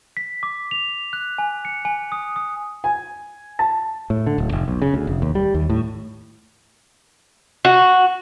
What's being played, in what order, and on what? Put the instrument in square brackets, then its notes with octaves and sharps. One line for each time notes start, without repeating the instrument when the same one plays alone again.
[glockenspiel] B6
D6
F7
F#6
G#5
C#7
G#5
D#6
D#6
[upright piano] G#5
A5
[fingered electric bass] A2
D3
D1
F1
B1
C#3
D2
F1
D#2
G3
D#2
A2
[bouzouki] F#4